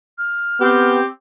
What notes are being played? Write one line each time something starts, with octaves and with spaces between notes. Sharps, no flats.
F6
B3 C4 G4